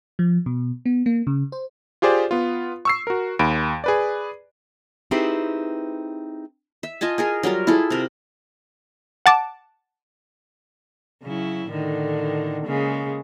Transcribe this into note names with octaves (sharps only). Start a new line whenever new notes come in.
F3
B2
B3
A#3
C#3
C5
F4 G4 G#4 C5 D5
B3 F4
C#6 E6 C7
F#4 A#4
D#2 B5 D7
G#4 B4 D5
C4 D#4 E4 G4 G#4 B4
E5
F4 D#5 G#5 A5
G#4 A#4 G#5
F#3 G3 F4 A#4
E4 F4 G#4 A4
C3 A#4
F#5 A5 D6
C#3 F#3 E4
A2 D3 D#3
C#3 G#3 A#3